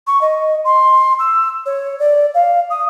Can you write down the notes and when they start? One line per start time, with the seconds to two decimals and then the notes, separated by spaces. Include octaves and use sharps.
0.07 C#6
0.21 D#5
0.65 C6
1.19 E6
1.66 C#5
1.99 D5
2.34 F5
2.70 D#6